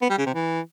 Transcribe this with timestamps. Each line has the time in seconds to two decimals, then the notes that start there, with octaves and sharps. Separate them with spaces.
0.02 B3
0.10 G3
0.18 C#3
0.26 C3
0.34 E3